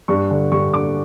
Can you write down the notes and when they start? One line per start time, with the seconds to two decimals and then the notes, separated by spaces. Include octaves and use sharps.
0.08 G2 C#6
0.31 D3
0.52 G2 C#6
0.73 D3 D6